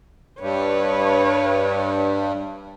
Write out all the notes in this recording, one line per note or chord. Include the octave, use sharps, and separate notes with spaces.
G2 B4 C#5